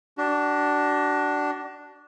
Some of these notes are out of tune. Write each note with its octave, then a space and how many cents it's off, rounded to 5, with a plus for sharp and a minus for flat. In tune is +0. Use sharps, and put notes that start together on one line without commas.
D4 +0 F#4 +40